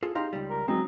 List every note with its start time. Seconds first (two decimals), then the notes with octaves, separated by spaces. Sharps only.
0.03 F4 G#4 A4
0.15 D#4 G4 F5 A#5 C6
0.33 C#2 G3
0.50 A#4
0.68 F#3 G#3 C4 D#4